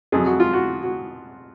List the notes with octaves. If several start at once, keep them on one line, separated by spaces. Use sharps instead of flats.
F2 C3 F#3 G#4
F#4
F4
F#4
F#4